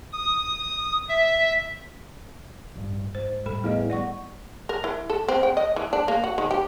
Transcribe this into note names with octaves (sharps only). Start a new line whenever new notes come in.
D#6
E5
A1 G2
G#2 C5
A2 G3 A4 B5
E2 A3 A4 D#5
G3 B3 D5 F#5 C#6
A#4
E4
A4
C4
G5
D#5
E3
D4
A#3
F#4
D#3
G4